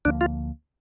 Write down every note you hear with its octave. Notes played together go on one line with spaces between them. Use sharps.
D2 D3 F3 A#3 D4
F4